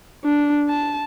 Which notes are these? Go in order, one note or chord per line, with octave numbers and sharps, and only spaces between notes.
D4
A5